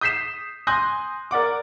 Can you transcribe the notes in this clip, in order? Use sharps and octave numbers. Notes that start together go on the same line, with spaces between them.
D#6 G6 B6 C7 E7
G#5 C6 D#6 F#6 G6 A#6
A#4 D5 F#5 D6